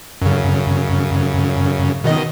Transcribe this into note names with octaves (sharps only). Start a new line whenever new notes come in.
F#2 C#3
B2 D#3 D#5